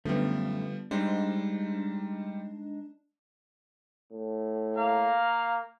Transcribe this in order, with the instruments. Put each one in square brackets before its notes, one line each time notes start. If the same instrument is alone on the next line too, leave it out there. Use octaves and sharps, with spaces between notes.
[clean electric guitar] F#2 A3 [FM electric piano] D3 B3 [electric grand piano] F3 G3
[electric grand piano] G3 C5 [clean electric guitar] G#3 D#4 [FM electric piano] D4
[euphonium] A2
[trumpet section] A#3 F5 A#5